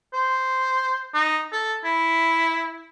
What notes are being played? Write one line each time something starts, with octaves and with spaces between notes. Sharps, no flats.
C5
D#4
A4
E4